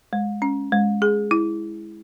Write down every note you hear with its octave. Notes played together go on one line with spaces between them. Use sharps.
G#3
C#4
G#3
G#4
E4